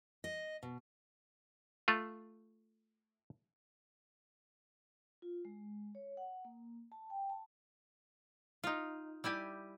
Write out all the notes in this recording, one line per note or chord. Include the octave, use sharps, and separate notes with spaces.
D#5
B2
A3 F4
F4
G#3
C#5
F#5
A#3
A5
G5
A5
D#4 F4
G3 E4 G4 G#5